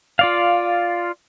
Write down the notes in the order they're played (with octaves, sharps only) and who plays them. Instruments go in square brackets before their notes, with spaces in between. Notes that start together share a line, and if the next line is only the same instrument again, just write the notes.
[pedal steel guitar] F4 D5 F5